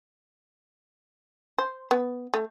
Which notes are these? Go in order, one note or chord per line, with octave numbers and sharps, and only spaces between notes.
C5
B3
A3